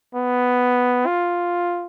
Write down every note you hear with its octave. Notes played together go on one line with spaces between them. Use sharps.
B3
F4